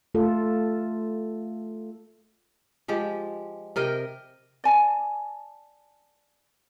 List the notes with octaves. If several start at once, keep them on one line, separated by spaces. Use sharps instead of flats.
A3 F4 A4
F3 G#3 G4
C3 A#4 D#5 G5
D5 G#5 A5